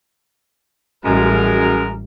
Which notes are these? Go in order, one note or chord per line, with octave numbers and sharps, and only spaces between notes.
A1 F#2 G3 G#3 A#4